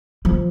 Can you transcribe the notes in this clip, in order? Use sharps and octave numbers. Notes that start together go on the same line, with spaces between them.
F3